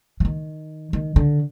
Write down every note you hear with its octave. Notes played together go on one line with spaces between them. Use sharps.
F3
D#3
D#3
D3